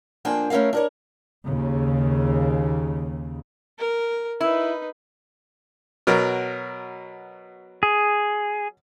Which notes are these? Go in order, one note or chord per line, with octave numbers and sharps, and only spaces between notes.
F2 A#3 D4 C5 G5 G#5
A3 C#4 E4 A#4 F5
D4 A#4 C#5
D#2 C#3
A#4
D#4 E4 B4
B2 F#3 A#4
G#4